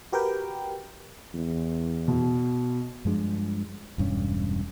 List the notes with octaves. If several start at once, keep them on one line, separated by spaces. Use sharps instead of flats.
F#4 G4 A#4 B4 G5
E2
B2
G2 F3 G#3 D4
E1 G2 C#4